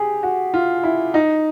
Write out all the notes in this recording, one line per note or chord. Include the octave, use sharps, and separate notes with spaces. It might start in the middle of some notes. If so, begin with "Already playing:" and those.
Already playing: G4 G#4
F#4
F4
E4
D#4